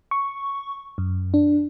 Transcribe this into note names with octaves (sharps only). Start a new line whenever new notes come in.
C#6
F#2
D4